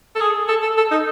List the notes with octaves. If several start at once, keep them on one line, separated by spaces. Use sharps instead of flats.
A4
G#4
A4
A4
A4
D#4